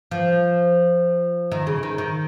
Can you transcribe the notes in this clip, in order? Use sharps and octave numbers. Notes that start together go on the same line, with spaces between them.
F3
D#3
C#3
D#3
D#3